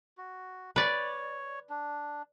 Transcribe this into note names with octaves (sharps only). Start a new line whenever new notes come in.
F#4
B4 C#5 D5
D4